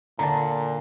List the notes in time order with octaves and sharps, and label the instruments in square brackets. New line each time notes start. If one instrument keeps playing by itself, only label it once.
[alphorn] A#2 [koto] D3 [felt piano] A5 A#5